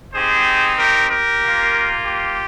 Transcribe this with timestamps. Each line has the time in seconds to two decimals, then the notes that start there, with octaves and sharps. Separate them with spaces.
0.14 C4 D#4 G4 G#4 C5
0.78 G4 A#4
1.10 G4 A#4
1.41 A#3 F4
2.06 G4